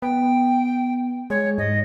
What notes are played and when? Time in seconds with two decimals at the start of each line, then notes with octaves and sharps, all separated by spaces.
0.02 B3 G5
1.30 G#3 C#5
1.58 G#2 D#5